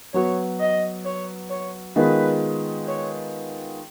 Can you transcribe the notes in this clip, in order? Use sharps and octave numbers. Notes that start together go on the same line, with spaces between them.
F#3 B3 F#4 C#5
D#5
C#5
C#5
D#3 G#3 B3 F4 B4
C#5